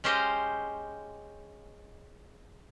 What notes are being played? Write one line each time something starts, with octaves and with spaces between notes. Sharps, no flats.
G#3 C#4 G4 C5 D#5 F5